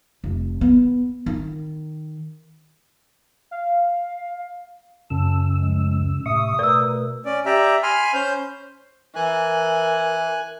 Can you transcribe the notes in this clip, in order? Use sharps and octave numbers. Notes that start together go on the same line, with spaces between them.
F1
B3
D#3
F5
F#2 C#3 A5 E6
D2 F3 G#3
A2 C3 E5 C#6 D#6
B2 A3 A#4 B4 D5 E6
C#4 D5
G4 D5 E5 A#5
G#5 B5 C6 F6
C#4 C5 G6
E3 A#4 G#5 F#6